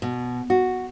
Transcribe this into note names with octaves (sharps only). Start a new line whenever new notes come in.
B2
F#4